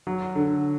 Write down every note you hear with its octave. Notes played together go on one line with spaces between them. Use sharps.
F#3
D3